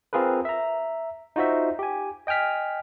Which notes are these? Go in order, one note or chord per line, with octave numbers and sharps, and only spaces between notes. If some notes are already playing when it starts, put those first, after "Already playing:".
C4 F4 G#4 A#4 B4
E5 A#5
D#4 F4 F#4 C5 E5
G4 G#5
D#5 G5 G#5 F6 B6